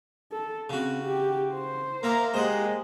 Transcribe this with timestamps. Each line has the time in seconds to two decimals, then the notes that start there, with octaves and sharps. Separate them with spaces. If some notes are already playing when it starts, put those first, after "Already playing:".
0.32 A4
0.70 C#3 C4 F#4
1.03 G4
1.54 C5
2.03 A#3 A#4 E5 A#5
2.34 G#3 A#3 G4 C5 D#5 F#5